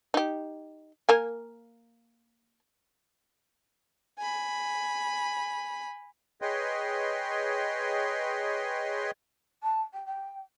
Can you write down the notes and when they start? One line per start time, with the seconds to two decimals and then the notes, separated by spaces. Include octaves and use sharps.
0.14 D#4 G4
1.09 A#3 A#4 G#5
4.18 G#5 B5
6.42 G#4 B4 C#5 D#5 G5 C6
9.63 A5
9.94 G5
10.06 G5